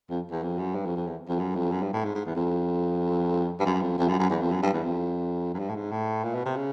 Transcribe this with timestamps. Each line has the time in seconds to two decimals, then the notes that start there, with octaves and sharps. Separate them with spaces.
0.10 F2
0.31 E2
0.43 F2
0.58 F#2
0.75 G2
0.86 F2
0.96 F2
1.07 E2
1.28 F2
1.39 F#2
1.55 F2
1.71 F#2
1.82 G2
1.93 A2
2.04 G#2
2.15 G#2
2.26 E2
2.36 F2
3.60 G2
3.65 F#2
3.82 F2
3.98 F2
4.08 F#2
4.19 F#2
4.30 E2
4.41 F2
4.51 F#2
4.62 G2
4.73 E2
4.84 F2
5.54 F#2
5.59 G2
5.69 A2
5.75 G#2
5.91 A2
6.24 A#2
6.35 B2
6.46 C3
6.56 C#3